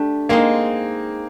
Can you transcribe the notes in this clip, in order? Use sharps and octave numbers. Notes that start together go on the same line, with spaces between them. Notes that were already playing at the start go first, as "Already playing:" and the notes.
Already playing: A3 D4 G4
G#3 A#3 C4 D#4